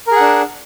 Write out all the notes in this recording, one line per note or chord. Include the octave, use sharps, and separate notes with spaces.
D4 G#4 A#4 F#5